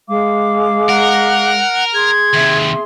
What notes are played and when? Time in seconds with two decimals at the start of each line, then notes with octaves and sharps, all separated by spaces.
0.08 G#3 F5 D6
0.89 A#4 F#5
1.94 G#4 C6 G#6
2.34 D#2 C3 E5